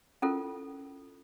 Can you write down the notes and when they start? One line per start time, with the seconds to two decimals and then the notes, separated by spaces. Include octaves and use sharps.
0.22 C#4 E4 F4 A4 A#4